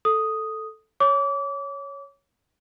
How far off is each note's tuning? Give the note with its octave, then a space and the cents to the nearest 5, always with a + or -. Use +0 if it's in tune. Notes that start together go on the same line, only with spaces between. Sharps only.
A4 +0 D#6 +0
C#5 +0 D6 -30